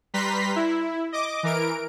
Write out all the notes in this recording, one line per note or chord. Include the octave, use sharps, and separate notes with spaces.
G3 B4 A#5 C6 B6
E4
D#5 D6
E3 A#4 D7